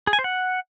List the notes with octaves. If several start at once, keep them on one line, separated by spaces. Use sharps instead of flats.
G#4
G#5
C5
F#5